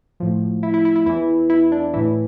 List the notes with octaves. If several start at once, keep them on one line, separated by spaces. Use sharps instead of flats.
A2 F3
E4
E4
E4
E4
E2 E3 E4
E4
D4
A2 E3 E4